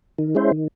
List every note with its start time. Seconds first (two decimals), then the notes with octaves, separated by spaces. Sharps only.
0.19 D#3
0.35 G#3 C#4 E4 C5
0.51 D#3